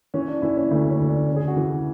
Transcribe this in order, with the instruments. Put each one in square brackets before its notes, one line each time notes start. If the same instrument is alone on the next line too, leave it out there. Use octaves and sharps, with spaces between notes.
[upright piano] E3 C#4
D4
E3 E4
C#4
D2 A3
C#4
D2
D4
C#3
G#4
F#4
E3
F#4